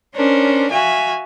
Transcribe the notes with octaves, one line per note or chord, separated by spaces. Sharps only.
C#4 D4 A#4 C5
F#4 E5 F5 G#5